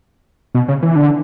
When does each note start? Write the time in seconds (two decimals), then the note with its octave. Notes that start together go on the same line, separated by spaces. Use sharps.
0.55 B2
0.68 C#3
0.83 E3
0.96 D3